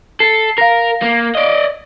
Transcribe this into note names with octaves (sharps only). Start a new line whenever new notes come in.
A4 C7
A#4 F5 A#6
A#3
D5 D#5